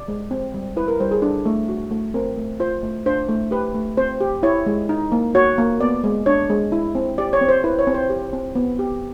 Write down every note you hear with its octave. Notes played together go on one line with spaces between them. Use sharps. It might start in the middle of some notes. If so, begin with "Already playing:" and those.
Already playing: D5
G#3
C4
G3
E4 B4
A#4
G3 C5
G#4
D4 A4
A3
F#4
A3
C4 A#4
A3
F4 C5
A3
D4 C5
A3
G4 B4
A3
C4 C5
G4
E4 C#5
G#3
D#4
A#3
F#4 C#5
A#3
B3 D5
G#3
D4 C#5
G#3
E4
C4
G4 D5
C#5
C4
C5
E4 B4
C#5
C4
C5
G4
C4
B3
G4